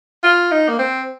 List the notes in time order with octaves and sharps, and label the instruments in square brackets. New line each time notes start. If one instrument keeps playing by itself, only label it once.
[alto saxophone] F4
D#4
A#3
C4